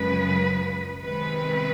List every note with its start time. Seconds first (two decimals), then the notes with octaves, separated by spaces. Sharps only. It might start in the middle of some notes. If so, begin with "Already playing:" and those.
Already playing: F#2 C#3 F3 G#3 B4
1.02 C3 D#3 G#3 C4 B4